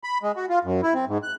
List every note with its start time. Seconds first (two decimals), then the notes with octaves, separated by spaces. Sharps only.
0.04 B5
0.23 G#3
0.36 F#4
0.49 F4
0.65 F#2
0.83 E4
0.94 C4
1.08 G#2
1.23 F#6